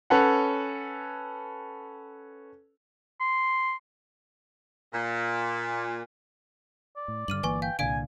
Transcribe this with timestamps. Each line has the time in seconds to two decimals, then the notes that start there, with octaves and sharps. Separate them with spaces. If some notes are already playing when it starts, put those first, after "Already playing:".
0.10 C#4 A4 B4 C#5 F#5
3.21 C6
4.93 A#2
6.96 D5
7.08 A2
7.28 G2 D3 F6 D#7 F#7
7.43 G1 E3 A#3 B4 G#5 C#6
7.62 F5 G5 G#5
7.79 C2 A#2 D3 D5 F5 G#5 D7